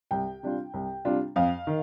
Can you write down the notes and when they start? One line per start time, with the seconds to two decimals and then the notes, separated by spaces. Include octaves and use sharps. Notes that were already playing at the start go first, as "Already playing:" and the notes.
0.11 C2 G5
0.43 C3 G3 D4 F4
0.74 C2
1.05 C3 G3 D4 F4
1.36 F2 F5
1.67 D#3